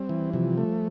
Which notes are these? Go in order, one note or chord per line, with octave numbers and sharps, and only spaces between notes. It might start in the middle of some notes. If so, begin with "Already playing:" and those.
Already playing: G3 C4
E3
C3 F3
A3